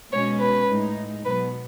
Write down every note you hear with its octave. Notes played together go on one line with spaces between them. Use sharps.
B2 G#3 C#4 C#5
B4
A2 G#3 D#4
B2 F#3 B3 B4